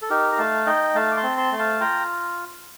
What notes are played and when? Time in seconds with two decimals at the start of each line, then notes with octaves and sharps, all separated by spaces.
0.02 A4
0.10 D#4 G4 A#4
0.32 A#5
0.38 A3 F5 A5
0.66 D#4 D#5 G5
0.95 A3 F5 A5
1.12 D6
1.17 A5 C6
1.23 C4
1.38 A5 C6
1.52 A3
1.59 F5 A5
1.80 F4 G5 A#5